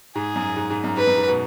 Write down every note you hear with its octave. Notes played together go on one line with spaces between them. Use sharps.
G#2 G#4
F#2
G#2
G#2
F#2
G#2 B4
F#2
G#2
B2